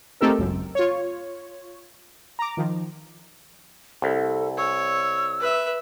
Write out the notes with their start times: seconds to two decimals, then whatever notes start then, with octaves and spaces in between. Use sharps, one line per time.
0.21 A3 C4 D#4 G4 A4 A#4
0.38 G#1 C#2 F#2
0.75 F4 C#5
2.39 A#5 D6
2.57 D#3 F3
4.02 C2 A4
4.57 C#5 E6
5.40 B4 E5